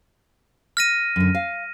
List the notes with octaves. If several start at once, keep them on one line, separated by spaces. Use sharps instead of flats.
F6 A#6 D#7
F#2 D3
F5